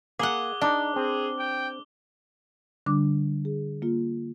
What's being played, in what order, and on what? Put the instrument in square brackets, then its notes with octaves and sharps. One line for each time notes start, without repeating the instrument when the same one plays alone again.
[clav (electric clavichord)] A#3 [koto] G#4 F#5 [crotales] D6 G7
[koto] D4 [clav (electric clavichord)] D#4 D5
[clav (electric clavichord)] C4 [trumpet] G#4
[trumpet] G5
[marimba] D3 G3 D4 D6
G#4
A#3 F4